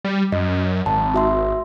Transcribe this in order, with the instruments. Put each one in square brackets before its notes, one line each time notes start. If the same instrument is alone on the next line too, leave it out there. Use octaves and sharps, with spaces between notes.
[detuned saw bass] G3
[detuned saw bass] F#2 [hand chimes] D#5
[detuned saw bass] G#1 [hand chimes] A5
[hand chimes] F#4 E5 C6